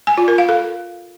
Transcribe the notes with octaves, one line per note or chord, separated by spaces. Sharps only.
G#5
F4
A#4
F5
A4